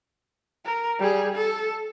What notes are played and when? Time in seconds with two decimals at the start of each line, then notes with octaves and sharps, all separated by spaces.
0.65 A#4
0.99 G3 G#4
1.35 A4